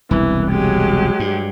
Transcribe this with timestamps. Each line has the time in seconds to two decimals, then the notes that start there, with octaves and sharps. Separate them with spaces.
0.11 E1 C2 E3
0.50 F#3 G#3 G4
1.20 G2